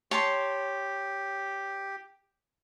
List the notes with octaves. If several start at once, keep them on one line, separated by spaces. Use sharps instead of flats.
G4 C#5 A5 C6